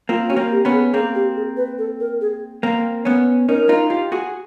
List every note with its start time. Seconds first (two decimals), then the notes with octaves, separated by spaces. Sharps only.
0.09 A#3 C4 F4
0.30 C#4 F#4
0.36 A#3 C4
0.51 G4
0.65 B3 C#4
0.72 G#4
0.94 A#3 C4 G#4
1.15 G4
1.36 G#4
1.57 B4
1.78 A4
2.00 A#4
2.21 G#4
2.63 A#3 C4
3.05 B3 C#4
3.48 C#4 D#4 A#4
3.69 D#4 F4
3.90 F4 G4
4.12 F#4 G#4